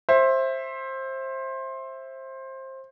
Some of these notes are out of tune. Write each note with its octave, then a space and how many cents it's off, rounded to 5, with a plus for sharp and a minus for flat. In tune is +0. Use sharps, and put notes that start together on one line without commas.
C5 +20 E5 +0